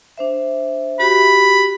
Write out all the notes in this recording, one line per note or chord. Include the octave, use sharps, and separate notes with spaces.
D4 C5 E5
F#4 G4 B5